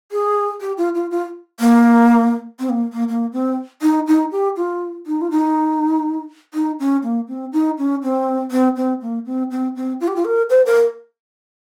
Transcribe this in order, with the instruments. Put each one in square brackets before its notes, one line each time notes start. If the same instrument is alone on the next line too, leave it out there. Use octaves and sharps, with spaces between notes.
[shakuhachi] G#4
G4
F4
F4
F4
A#3
C4
A#3
A#3
A#3
C4
D#4
D#4
G4
F4
D#4
F4
D#4
D#4
C#4
A#3
C4
D#4
C#4
C4
C4
C4
A#3
C4
C4
C4
F4
G4
F4
A#4
C5
A#4